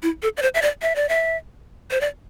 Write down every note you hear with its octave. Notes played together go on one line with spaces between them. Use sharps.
E4
A4
D5
C5
E5
D5
E5
D5
E5
C5
D5